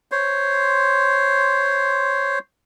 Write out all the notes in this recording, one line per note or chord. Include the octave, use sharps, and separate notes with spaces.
C5 C#5 C6